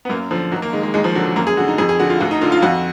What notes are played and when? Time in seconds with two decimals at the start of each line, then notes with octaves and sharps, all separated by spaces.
0.05 B3
0.09 F#2 A#3
0.31 D3 F3
0.52 D#2 F#3
0.62 A#3
0.73 D#3 G#3
0.83 G#3
0.94 D#2 G#3
1.04 F3
1.15 D3 F#3
1.26 F#3
1.36 F#2 A#3
1.47 G#4
1.57 D3 F#4
1.68 D#4
1.78 F2 G#4
1.89 G#4
1.99 D3 F#4
2.10 F4
2.20 D2 F#4
2.31 D#4
2.41 D3 F4
2.52 F4
2.63 F2 F#4